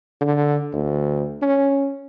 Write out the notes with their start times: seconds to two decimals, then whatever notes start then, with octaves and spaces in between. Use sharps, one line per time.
0.21 D3
0.73 D2
1.42 C#4